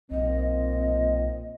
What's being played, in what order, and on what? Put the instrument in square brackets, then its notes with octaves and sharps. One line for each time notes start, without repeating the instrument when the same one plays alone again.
[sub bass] B1 [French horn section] A#2 C4 [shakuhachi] D#5